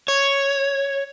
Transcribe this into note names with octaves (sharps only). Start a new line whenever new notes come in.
C#5